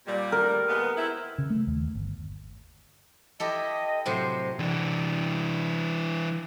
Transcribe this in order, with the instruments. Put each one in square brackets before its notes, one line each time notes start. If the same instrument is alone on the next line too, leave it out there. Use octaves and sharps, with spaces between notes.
[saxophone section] A#2 G3
[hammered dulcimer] A#4
[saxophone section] D#2 G#3 B3
B3 C4 E4
[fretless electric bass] C#3
A3
D#2
G1
[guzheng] E4 G4 A4 [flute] D#5
[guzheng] A2 C3 F#3 [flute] C5
[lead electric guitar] E3 D4